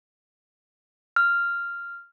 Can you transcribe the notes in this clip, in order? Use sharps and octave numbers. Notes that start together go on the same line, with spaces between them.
F6